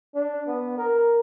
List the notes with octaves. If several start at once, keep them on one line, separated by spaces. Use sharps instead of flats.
D4
B3
A#4